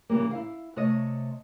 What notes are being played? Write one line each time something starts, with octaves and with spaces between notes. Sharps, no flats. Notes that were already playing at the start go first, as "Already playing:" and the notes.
C#3 E3 F3 G3 A#3
E4 F5
C3 A3 C#5 D#5